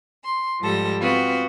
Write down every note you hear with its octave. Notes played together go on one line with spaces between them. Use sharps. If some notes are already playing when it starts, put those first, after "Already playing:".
C6
G#2 F3 G3 A4 A#6
B3 C4 F4 F#4